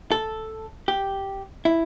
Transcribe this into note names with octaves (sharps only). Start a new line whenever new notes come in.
A4
G4
E4